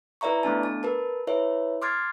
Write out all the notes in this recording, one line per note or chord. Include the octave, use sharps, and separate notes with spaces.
E4 B4 D5 E5 A#5 C#6
A3 B3 D4 A5
A5
A#4 B4 A5
E4 B4 C#5 E5
C6 D6 F6 G#6 A6 C7